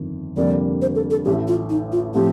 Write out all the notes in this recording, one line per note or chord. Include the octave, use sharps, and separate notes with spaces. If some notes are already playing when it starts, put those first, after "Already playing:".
Already playing: G1 F2 D#3
F1 F2 D3 G3 A#3 D5
C5
A4
A4
A1 A2 A3 G4
F4
D#4
F4
A2 F3 C4 G4